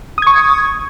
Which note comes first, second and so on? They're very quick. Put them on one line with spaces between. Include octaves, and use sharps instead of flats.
D#6 G#6 C#6